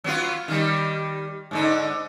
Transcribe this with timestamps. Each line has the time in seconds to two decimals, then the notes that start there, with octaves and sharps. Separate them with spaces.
0.04 F#3 B3 F4
0.48 D#3 G3
1.51 G#2 D3 D#4